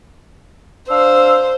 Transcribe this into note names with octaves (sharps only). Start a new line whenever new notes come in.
D4 C5 F5 E6